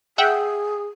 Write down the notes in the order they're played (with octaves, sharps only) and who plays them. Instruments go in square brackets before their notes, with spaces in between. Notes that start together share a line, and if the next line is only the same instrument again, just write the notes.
[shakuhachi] G#4 [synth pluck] E5 F#5 G5